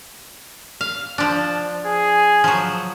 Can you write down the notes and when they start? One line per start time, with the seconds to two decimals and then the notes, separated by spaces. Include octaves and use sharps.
0.81 F5
1.18 F3 D4
1.86 G#4
2.44 F3 F#3